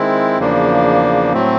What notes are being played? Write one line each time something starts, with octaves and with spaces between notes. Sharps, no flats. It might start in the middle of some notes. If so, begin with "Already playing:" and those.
Already playing: D#3 G#3 C4 E4
E2 C#3 F3 A#3 D4
A2 F#3 A3 C4